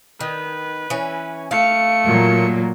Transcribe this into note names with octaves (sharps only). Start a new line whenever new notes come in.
D#3 B4
E3 C#4
A3 F5 C#7
A#2 F#3